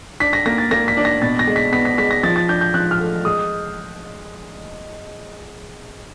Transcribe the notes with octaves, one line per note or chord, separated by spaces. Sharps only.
D4 B6
A#6
A#3 A#6
A6
A#3 A#6
B6
D4
A#6
B2 A6
A#6
G#3
B6
B3 B6
B6
G#3 B6
A#6
F3 A6
A6
D4 G6
G6
F3 F#6
F6
A3
G#3 D#6